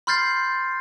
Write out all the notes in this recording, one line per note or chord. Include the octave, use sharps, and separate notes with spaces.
B5 C6 F6 G6 A6 C7